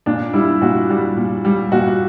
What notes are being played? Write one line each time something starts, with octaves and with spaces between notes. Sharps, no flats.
A#2 D4
G3 E4
A#2 F#4
G3
A#2
G3
A#2 F#4